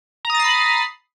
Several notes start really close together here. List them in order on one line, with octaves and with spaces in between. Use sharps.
A#5 D#6 A6 C7 B5